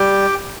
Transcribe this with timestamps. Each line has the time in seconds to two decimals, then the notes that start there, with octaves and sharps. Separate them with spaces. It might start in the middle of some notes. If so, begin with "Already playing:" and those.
Already playing: G3 G4 G5